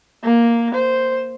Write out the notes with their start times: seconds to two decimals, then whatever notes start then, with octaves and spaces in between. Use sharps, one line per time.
0.24 A#3
0.75 C5